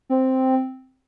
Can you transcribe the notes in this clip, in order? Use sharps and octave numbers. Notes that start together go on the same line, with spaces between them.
C4